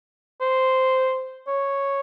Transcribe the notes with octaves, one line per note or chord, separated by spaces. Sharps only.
C5
C#5